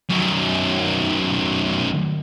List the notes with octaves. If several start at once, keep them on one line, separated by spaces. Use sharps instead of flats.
F#2 D#3